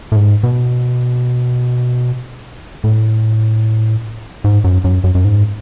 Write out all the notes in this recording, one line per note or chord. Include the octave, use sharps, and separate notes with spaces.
A2
G#2
B2
A2
G#2
F#2
F#2
F#2
F#2
G#2